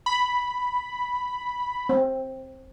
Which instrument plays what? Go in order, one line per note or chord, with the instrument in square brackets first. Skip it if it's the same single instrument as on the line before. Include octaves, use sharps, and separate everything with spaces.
[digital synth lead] B5
[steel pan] C4